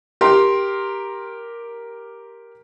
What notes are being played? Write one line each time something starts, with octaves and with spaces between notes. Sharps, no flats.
G4 A#4 C6